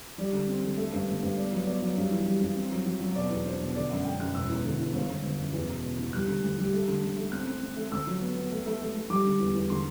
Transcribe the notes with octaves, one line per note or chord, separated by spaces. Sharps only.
G3 D5
D3
C4
D3
A3
G2
G1
G2
B3 D5
F#3
B3 D5
F#3
G2
E3
G3
G2
C4
F#3
F#3
F#3
B2 D5
E2
D4 C5
B2
D3 D5
F#2 F#5
F#2 G5
F#2 F#6
E1 E6
E2
D3
E2
G1
G1
G1
F#2
E2
B2
B2
F#1
G3 F#6
D3
D2
G3
A3
D3
D3
A3
C4 F#6
C4
C4
A3
D2 E6
F#3
B3
B3
A3
A3
A3
A3
G3 D6
D3
E2
E2
D3 C6